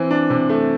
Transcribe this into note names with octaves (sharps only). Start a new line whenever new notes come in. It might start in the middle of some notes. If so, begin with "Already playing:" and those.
Already playing: E3 C4
D4
C3
A3